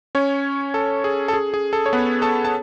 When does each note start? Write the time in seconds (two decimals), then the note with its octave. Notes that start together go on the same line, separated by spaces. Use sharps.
0.15 C#4 C#5
0.74 A4
1.04 G#4
1.28 A4
1.33 G#4
1.54 G#4
1.73 A4
1.86 C#5
1.93 B3 B4
2.22 A4 A5
2.45 A5